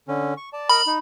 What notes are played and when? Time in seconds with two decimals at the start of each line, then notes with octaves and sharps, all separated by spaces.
0.08 D3 C#4
0.37 C#6
0.53 D5 A5
0.69 A#4 D#5 B5
0.87 D#4